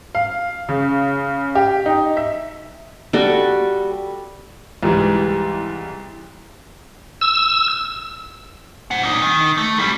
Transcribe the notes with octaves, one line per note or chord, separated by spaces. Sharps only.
F5
C#3
G4
D#4
E5
G3 F#4 A4
C2 G#2 E3 G3
E6
C5 F#5
A#2 D#4
D#3
A3
G3 E4